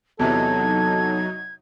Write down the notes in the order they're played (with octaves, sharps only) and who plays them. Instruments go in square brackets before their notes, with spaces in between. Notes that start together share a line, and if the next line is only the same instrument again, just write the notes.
[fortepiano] E2 C3 E3 [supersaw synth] F#3 D#4 [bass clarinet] A4 [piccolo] G#6